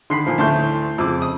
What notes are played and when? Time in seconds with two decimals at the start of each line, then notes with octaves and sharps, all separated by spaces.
0.10 D3 D#3 B5 C6 C7
0.26 A#2 F3
0.38 D2 A2 A3 A5 C6 G6
0.98 F2 C#3 D6 E6
1.22 D#6